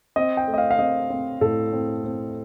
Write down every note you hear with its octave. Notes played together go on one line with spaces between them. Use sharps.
C4 D#5
G5
A3
D#5
F5
F5
C4 D#5
C4
A2 A4
C4
C4